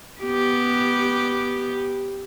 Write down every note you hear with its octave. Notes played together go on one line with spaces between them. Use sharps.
B3 G4